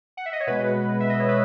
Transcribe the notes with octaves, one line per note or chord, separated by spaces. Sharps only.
F#5
E5
D#5
C#5
B2 G#3 B3 B4
E5
D#5
C#5
B4